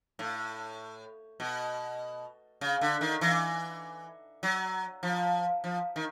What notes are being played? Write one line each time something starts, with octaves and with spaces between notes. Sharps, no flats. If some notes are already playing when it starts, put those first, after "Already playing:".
A2
B2
C#3
D3
D#3
E3
F#3
F3
F3
D#3